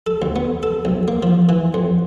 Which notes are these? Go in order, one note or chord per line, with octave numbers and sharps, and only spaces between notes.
A4
D2
B3
A4
B1
A#3
F3
E3
F2